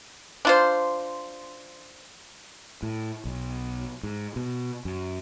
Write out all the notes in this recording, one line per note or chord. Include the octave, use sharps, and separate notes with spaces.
D4 F4 C5
A2
B1
G#2
B2
F#2